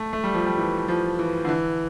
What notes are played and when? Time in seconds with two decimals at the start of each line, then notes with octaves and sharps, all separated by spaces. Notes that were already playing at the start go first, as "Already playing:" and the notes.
Already playing: A3
0.13 A3
0.24 G3
0.34 F3
0.46 G3
0.58 E3
0.88 F3
1.19 E3
1.45 D3
1.49 E3